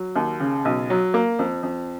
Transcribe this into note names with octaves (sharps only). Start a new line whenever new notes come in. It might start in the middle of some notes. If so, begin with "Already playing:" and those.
Already playing: F#3
D#2
C#3
B1
F#3
A#3
F2
F2